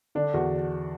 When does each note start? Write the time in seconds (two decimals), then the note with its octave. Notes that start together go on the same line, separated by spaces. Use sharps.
0.15 D3 D4
0.34 E2 F#4